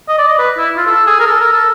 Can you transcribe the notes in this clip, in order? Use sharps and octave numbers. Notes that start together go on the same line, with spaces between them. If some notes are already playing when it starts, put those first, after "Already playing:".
D#5
D5
D#5
B4
E4
F4
A4
G#4
A#4
A4
A#4
A4